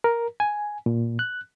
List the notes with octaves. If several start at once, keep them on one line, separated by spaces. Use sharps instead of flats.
A#4
G#5
A#2
F#6